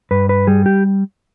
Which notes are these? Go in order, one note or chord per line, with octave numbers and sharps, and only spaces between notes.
G2 B4
B4
G3 G#4
G4